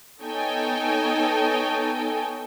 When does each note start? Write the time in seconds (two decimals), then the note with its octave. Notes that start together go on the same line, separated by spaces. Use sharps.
0.22 B3 D#4 A4 C#5 G5 G#5